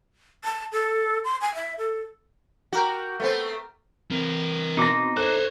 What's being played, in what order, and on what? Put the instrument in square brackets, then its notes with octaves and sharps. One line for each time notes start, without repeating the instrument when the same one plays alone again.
[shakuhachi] A5
A4
C6
G#5
E5
A4
[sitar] F#4 [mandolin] G4 A#4 G5
[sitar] A3 B3 C4
[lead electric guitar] E3 A#4 [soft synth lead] C4
[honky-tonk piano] B2 C6 A#6 [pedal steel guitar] D#4 D6
[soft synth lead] A4 [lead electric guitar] C5 C#5 [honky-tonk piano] F#6